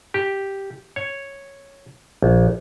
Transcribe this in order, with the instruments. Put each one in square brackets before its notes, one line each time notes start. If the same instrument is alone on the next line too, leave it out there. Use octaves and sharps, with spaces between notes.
[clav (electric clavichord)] G4
C#5
A#1